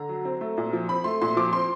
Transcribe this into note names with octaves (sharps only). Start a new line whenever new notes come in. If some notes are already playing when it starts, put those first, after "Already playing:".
Already playing: D3 A#5
F#3
C4
A3
A#2
F3
C4 B5
A3 C6
A#2 C6
F3 D6
C4 C6